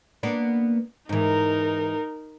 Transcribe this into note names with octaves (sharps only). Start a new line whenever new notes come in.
A#3 B3 D4
G#2 E3 D#4 A#4